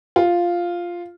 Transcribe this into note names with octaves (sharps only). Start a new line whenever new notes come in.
F4